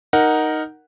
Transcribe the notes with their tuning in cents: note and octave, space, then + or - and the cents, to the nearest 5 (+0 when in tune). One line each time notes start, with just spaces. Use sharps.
D#4 +0 A#4 +0 F#5 +0